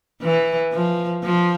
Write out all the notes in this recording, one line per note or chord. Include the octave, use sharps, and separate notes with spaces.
E3
F3
F3